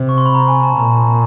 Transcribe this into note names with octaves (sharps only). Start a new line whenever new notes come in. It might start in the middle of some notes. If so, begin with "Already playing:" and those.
Already playing: C3
C#6
C6
B5
A#5
G#5
A5
A#2 A#5